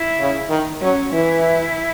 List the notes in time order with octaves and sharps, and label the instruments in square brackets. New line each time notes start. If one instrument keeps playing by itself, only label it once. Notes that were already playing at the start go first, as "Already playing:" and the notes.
Already playing: [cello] E4
[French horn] C#3
D#3
[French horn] F#3 [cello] C#4
[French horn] E3 [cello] E4